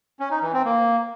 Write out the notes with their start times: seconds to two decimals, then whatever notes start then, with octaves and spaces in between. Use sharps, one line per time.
0.20 C#4
0.31 D#4
0.42 E3
0.54 C4
0.65 A#3